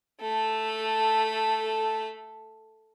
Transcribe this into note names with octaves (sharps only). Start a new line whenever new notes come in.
A3 A4